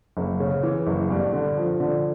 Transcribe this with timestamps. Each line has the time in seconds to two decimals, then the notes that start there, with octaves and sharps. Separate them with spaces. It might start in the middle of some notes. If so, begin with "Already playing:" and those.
0.17 F#1
0.40 C#3
0.63 E3
0.87 F#1
1.10 G2
1.33 D3
1.57 F3
1.80 D3